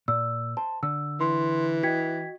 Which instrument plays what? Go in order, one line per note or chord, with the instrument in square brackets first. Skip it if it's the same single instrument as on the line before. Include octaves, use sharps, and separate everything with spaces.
[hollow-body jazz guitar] A#2 [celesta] E6
[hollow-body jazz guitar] C5 [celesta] A5
[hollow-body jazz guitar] D3 [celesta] E6
[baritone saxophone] E3 [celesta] C6
[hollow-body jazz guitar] F#4 D#5 [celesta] G5 G#6 B6